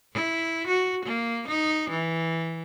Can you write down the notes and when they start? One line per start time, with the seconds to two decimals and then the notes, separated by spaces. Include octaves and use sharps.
0.13 E4
0.68 F#4
1.06 A#3
1.48 D#4
1.91 E3